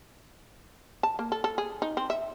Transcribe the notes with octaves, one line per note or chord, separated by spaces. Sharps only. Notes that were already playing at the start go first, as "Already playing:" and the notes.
A5
A#3
A4
A4
G#4
D#4
C4
E5